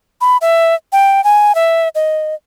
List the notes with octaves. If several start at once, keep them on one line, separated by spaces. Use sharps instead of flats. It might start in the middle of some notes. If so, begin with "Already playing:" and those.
B5
E5
G5
G#5
E5
D#5